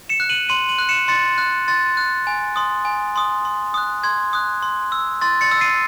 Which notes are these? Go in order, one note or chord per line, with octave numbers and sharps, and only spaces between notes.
C#7 E7
F#6
D#7 F#7
C6 D#7 F#7
D#7 F#7
F#6
C#7 E7
C6 A6 C#7
F#6
C6 A6
F#6
G#5
C6 D#6
G#5
C6 D#6
C6
D#6 F#6
C6 G#6
D#6 F#6
C6
E6
C6 A6
A6 C#7
E6
C7 D#7